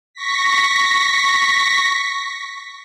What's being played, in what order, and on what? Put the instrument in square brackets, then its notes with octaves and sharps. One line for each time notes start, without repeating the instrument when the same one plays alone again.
[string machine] C#6 A#6 B6